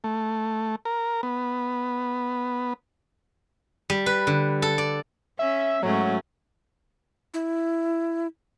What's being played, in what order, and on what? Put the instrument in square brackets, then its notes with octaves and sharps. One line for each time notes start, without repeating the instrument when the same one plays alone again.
[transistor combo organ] A3
A#4
B3
[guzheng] G3
B4
D3
A4
D5
[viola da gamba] C#4 [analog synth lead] E5
[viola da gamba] G#2 A3 C#4 [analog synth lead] F#3
[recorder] E4